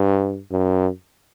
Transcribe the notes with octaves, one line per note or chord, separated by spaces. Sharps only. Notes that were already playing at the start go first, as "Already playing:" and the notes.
Already playing: G2
F#2